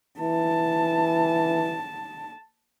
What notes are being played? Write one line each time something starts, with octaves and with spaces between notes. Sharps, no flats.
E3 A5